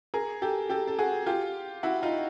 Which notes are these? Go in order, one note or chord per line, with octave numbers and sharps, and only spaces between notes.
G#4 A#4
G4 A4
G4 A4
A4
F#4 G#4
F4 G4
E4 F#4
D#4 F4